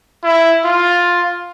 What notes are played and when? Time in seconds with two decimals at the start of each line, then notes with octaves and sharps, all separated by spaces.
0.24 E4
0.65 F4